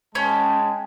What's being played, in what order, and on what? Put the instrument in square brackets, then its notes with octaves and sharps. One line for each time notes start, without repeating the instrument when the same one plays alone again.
[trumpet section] G#3 G5 A5 [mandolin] C#4